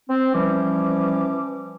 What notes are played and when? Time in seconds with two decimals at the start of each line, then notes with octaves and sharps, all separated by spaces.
0.08 C4
0.34 E3 F3 G3 C#4 D6